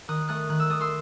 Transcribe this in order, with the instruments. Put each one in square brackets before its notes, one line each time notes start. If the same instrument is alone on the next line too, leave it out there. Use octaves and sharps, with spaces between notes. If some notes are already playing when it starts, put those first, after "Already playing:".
[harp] D#3 D#6 F#6
A3 D#6 F#6
D#3 F#6
E6
A3 D#6
C6 E6